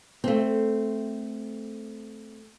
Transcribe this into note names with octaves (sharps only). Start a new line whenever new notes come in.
A3 C4